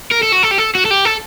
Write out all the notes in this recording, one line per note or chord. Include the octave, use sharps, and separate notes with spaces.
A#4
A4
F#4
A4
G4
A4
F#4
A4
G4
A4